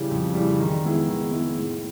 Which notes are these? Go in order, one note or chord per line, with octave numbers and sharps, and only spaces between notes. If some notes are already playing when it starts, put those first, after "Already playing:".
Already playing: C#3 E3 G3
F2
C#3 E3 G3
D#3
G#3 B3 E4 G#4
D#3
G#3 B3 E4 G#4
A2